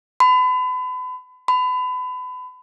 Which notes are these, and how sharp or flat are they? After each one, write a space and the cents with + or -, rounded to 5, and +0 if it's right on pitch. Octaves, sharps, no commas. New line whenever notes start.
B5 +35
B5 +30